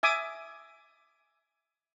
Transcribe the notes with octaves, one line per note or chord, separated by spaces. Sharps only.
E5 G#5 D6 D#6